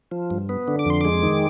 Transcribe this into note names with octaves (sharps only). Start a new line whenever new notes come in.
F3
G2
B3
D3
D6
F2 C6
G#3 D6
D#3